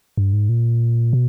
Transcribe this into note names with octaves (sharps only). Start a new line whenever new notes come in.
G2
G#2
A#2
B2